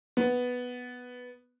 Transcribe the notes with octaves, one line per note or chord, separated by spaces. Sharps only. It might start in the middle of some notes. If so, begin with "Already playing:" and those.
B3